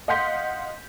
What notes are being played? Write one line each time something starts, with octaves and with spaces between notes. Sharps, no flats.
D#5 F5 F#5 C6 G6 B6